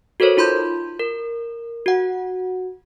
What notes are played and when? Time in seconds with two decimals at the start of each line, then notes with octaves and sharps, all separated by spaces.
0.20 F#4 A4 A#4 C5 C#5
0.37 D#4 F4 B5 C6 G6
1.00 A#4
1.86 F#4 F#5